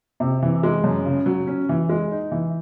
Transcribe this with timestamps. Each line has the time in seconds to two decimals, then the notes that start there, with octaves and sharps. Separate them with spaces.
0.20 C3
0.42 E3
0.63 G#3
0.84 F#2
1.06 C#3
1.26 F#3
1.47 C#4
1.69 E3
1.89 G#3
2.11 D#4
2.31 E3